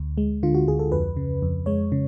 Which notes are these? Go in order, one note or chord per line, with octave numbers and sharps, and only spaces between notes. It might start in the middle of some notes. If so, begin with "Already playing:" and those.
Already playing: D2
G#3
D3 F4
F#4
D2 G#4
A4
F2 B4
C#3
F2
G#3 C#5
C#3